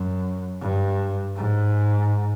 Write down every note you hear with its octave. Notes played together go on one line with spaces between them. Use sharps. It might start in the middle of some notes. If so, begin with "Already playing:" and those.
Already playing: F#2
G2
G#2